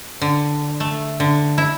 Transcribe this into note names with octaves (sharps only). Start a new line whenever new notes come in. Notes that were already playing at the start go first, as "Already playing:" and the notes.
D3
A3
D3
E4